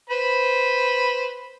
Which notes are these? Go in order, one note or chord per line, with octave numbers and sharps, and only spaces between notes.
B4 C5 B5